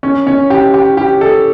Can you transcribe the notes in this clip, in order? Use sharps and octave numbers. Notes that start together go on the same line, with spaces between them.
C#4
C#4
G4
G4
G4
A4